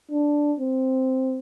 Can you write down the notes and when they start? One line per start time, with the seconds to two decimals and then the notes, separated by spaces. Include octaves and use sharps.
0.11 D4
0.60 C4